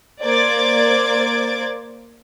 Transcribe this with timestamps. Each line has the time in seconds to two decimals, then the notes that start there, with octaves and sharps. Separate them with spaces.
0.22 A#3 C5 D5 D6 G#6 A6